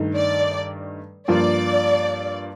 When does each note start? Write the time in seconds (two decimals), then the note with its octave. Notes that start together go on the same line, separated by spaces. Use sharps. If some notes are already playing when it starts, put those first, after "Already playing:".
Already playing: G2 D#3 A3 D#4
0.17 D5
1.28 G2 F3 A#3 F4 D5